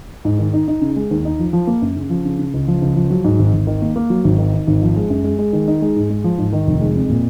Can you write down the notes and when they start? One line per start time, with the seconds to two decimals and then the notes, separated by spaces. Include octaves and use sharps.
0.25 G#2
0.39 D#3
0.54 D#4
0.68 D#4
0.81 C#3
0.96 G#3
1.11 D#2
1.25 D#4
1.39 F3
1.53 F3
1.67 A#3
1.82 F#2
1.96 C#3
2.10 F3
2.25 C#3
2.39 C#3
2.54 C#2
2.67 F3
2.82 C#2
2.96 F3
3.10 F#3
3.24 G#2
3.39 G#1
3.53 G#1
3.67 D#3
3.82 A#3
3.96 A#3
4.10 F#3
4.24 G#1
4.38 D#3
4.53 D#3
4.67 G#1
4.82 F3
4.96 G#3
5.10 F#2
5.24 G#3
5.39 G#3
5.53 D#3
5.68 D#4
5.82 G#3
5.96 G#2
6.10 G#3
6.24 F3
6.38 G#2
6.53 D#3
6.67 F1
6.81 G#3
6.95 F2
7.10 A#2